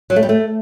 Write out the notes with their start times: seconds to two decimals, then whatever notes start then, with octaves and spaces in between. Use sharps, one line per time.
0.10 F#3
0.16 A3
0.23 G3
0.29 A3